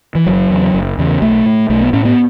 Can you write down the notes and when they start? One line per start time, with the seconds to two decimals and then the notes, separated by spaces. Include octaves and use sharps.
0.15 E3
0.26 F#1 F#3
0.50 E2 C#3
0.74 F#1
0.98 E2 C#3
1.21 B1 A3
1.45 A2
1.69 B1 A3
1.81 B3
1.93 A2 C#4
2.05 B3